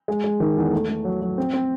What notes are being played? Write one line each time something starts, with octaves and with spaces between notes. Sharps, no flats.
G#3
G#3
D#3
E2
A3
A3
F#3
F#3
C4
C4